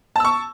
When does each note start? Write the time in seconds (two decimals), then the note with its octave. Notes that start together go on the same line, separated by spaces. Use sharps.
0.16 A5
0.20 E6
0.25 C#6